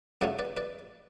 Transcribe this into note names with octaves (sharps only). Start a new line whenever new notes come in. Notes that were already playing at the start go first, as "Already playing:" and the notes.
F#2 C#3 F#3 A3 C#4 D5 F#5
B4 D5
B4 D5